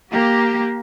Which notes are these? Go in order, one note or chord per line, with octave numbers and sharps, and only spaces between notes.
A#3 G4